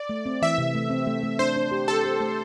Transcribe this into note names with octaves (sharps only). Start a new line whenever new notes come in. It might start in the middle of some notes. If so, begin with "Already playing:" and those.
Already playing: D5
A3
C4
E3 E5
C3
A3
C4
A3
A3
D4 C5
D4
G4
G4 A4
G4
A3